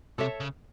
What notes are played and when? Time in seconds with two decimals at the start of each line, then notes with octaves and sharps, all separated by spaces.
0.18 C3 A4 C#5 E5
0.40 C#3